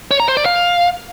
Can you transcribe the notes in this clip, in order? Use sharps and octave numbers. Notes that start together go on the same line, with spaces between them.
C#5
A#5
C5
D5
F5